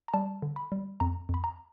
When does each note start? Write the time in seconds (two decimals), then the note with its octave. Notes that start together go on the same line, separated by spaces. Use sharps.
0.08 A#5
0.13 G3 A5
0.42 D3
0.56 B5
0.72 G3
1.00 F2 A#5
1.29 F2 B5
1.44 A#5